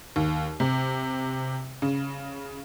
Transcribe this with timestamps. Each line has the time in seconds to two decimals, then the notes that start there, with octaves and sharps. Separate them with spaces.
0.16 D#2
0.60 C3
1.82 C#3